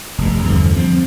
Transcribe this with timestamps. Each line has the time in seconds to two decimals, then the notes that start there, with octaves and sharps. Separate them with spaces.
0.18 F1 G2
0.44 E2 G2 D3 F3
0.76 F3 C4